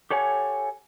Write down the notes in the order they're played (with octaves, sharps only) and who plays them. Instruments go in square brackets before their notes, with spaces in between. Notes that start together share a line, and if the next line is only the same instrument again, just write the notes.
[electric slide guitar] G4 A4 C#5 F#5 G#5